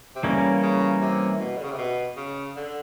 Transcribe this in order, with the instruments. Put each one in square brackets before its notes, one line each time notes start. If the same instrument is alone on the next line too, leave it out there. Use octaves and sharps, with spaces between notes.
[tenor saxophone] C3
[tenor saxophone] C#3 [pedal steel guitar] E3 G3 A#3 C#4
[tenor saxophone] C#3
C3
B2
D3
C#3
C3
B2
C#3
D3